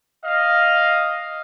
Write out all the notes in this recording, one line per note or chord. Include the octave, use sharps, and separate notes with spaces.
D#5 F5